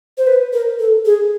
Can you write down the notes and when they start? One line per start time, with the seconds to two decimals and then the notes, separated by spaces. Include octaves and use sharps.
0.18 C5
0.27 B4
0.53 A#4
0.79 A4
1.05 G#4